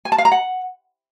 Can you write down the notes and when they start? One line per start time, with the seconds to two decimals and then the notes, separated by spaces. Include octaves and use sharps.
0.05 G#5
0.12 A5
0.18 F5
0.25 A#5
0.32 F#5